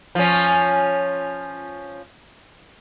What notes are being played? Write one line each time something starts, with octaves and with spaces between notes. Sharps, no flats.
F3 C#4